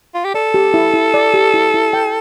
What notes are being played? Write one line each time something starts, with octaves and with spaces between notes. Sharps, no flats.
F4
G4
A4 D5
G4
E4
E4
D5
G4
E4
E4
G5